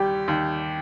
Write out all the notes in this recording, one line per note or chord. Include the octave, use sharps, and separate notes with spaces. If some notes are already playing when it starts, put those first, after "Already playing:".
Already playing: D#2 G3 G4
D#2